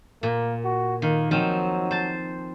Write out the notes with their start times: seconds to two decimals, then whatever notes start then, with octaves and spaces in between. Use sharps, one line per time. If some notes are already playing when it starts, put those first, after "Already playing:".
0.23 A#2 A#3
0.64 F#4
1.02 D#3 A#3
1.31 F3 F#3 C4 D#4
1.91 C5 A5